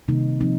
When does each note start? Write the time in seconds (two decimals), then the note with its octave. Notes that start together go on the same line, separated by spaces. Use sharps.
0.08 C3 D#3 G3 A#3 D#4
0.40 F3 C4 D#4